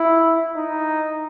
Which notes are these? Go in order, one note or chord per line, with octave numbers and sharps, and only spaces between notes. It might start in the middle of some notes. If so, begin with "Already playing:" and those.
Already playing: E4
D#4